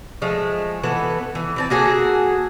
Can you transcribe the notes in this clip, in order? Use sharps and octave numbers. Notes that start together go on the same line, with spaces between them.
F3 G#3 A3
E3 B3 A4
E3
E3 C4 A5
A#3 F#4 G#4 A4